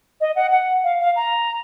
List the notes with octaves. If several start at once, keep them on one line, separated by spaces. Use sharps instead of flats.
D#5
F#5
F#5
F5
F5
A#5